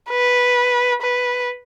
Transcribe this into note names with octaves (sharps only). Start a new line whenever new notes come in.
B4
B4